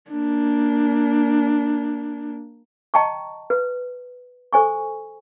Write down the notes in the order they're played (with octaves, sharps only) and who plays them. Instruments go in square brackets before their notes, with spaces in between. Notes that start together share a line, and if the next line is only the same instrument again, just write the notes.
[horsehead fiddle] A#3 D4
[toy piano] D#5 G5 A5 A#5 C#6
B4
A4 C5 G#5 C#6